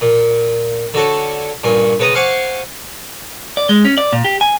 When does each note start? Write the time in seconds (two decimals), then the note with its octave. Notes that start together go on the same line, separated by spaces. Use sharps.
0.01 A#2
0.94 D3 F#4 A4 C#5
1.64 G2 A#2 C#4
2.00 C#3 B3 B4 A#5 D#6
2.15 C5 F5 F#5 G#5 C#6 D6
3.57 D5
3.69 G#3
3.85 C#4
3.98 D5
4.13 A#2
4.24 G4
4.41 G#5